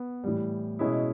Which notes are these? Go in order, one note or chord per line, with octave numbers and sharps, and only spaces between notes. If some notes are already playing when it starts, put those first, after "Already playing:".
Already playing: B3
A2 E3 G3
B2 G#3 C#4 E4